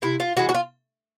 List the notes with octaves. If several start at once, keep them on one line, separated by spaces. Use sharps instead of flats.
C3 E4
F4
E3 G#3 F#4
F#4
F4